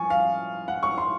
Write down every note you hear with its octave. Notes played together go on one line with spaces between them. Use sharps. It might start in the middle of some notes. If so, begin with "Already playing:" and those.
Already playing: F3 G#5 C#6
F5
F#5
C#6
C6